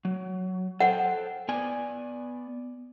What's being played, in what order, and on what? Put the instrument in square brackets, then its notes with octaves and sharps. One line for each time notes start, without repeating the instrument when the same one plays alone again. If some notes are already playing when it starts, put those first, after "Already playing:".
[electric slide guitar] F#3
[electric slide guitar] A4 C5 G5 [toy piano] F#5
[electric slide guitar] B3 D5 G#5